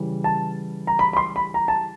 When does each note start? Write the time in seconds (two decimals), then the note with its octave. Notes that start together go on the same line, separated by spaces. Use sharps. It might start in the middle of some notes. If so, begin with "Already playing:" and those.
Already playing: C#3 E3 G3
0.24 A5
0.87 A#5
0.99 B5
1.13 B5
1.17 C6
1.36 B5
1.54 A#5
1.68 A5